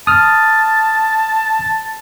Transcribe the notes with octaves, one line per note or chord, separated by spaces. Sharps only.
A5 D#6 F6